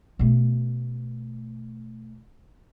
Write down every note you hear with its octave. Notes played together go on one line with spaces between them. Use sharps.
B2 A3